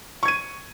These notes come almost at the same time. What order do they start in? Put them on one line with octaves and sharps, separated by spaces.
C#6 G#6 D#7